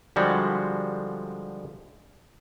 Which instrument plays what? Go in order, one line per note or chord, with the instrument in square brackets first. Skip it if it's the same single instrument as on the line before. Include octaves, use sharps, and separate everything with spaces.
[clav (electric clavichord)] D3 F3 G3 G#3 F#4